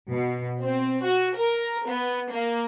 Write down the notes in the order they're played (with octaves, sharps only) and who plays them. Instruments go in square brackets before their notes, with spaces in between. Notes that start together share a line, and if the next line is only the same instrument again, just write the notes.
[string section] B2
C4
F#4
A#4
B3
A#3